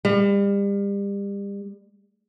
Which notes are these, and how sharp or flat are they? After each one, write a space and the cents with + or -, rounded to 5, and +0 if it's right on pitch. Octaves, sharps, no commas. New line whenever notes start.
G3 +35